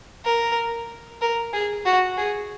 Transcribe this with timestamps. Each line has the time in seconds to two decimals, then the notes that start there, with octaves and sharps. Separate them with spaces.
0.25 A#4
1.21 A#4
1.53 G#4
1.86 F#4
2.18 G#4